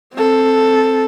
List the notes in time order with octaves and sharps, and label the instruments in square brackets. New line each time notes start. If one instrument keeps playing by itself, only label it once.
[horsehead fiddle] C4 A4